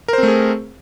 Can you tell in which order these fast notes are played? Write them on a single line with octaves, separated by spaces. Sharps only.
A#4 C5 C4 A3 G#4